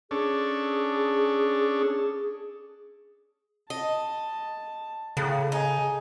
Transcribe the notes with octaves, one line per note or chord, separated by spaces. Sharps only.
C#4 D4 G#4 A4
D#5 A5
A2 C#3
D#4 G#5